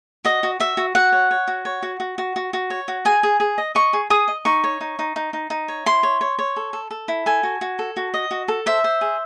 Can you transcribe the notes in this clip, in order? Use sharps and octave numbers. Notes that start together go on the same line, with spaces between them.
F#4 D#5
F#4
F#4 E5
F#4
F#4 F#5
C#5
C#5
F#4
C#5
F#4
F#4
F#4
F#4
F#4
C#5
F#4
G#4 G#5
G#4
G#4
D#5
D#5 C#6
G#4
G#4 D#6
D#5
D#4 C#6
C#5
D#4
D#4
D#4
D#4
D#4
C#5
E4 C6
C#5
C#5
C#5
A4
A4
A4
E4
A4 G#5
F#4
F#4
A4
F#4
D#5
F#4
A4
C5 E5
C5
G#4